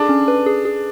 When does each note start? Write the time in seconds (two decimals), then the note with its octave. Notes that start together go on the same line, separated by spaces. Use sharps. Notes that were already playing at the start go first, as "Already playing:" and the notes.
Already playing: D4 G#4 A4
0.09 C#4
0.28 B4
0.46 G#4
0.65 G#4